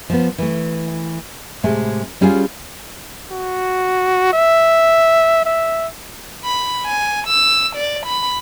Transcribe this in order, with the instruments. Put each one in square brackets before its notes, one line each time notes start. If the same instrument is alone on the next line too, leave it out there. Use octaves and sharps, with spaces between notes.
[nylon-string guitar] F3 B3
E3 A3
A2 C3 G#3 A3
G3 C#4 F4 F#4 G#4
[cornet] F#4
E5
E5
[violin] B5
G#5
E6
D5
B5